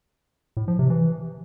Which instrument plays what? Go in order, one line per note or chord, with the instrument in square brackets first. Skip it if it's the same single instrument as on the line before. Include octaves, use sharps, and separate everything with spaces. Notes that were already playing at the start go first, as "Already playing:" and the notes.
[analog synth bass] A2
F3
C3
E3